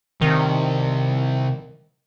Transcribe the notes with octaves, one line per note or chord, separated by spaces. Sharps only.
C2 C3 D#3